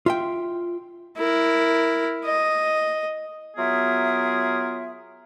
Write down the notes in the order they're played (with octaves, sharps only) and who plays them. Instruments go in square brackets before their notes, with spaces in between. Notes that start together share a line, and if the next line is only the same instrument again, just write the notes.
[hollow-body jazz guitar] F4 E5 G5
[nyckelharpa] E4 A#4
D#5
[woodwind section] F#3 B3 F4 G#4 A#4 E5